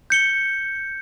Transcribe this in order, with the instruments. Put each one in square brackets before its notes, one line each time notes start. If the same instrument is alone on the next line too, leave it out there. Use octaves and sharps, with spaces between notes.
[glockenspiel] G6 C#7 G7